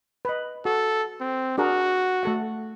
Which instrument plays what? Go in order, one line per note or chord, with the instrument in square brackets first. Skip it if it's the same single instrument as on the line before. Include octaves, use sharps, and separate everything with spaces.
[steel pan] B4 D#5
[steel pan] F#4 [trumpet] A4
[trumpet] C4
[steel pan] D4 G#4 A#4 [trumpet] F#4
[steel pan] A3 A4 F#5